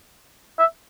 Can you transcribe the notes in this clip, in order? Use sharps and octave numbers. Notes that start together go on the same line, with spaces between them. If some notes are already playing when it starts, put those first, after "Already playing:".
E5